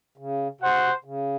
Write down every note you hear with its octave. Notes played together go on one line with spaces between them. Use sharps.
C#3
C3 F#4 C5 F#5
C#3
C3
C#3